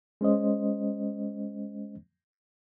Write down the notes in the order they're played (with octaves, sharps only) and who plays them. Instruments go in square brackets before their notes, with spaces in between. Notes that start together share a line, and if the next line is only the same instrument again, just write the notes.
[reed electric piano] G#3 C#4 C5 D#5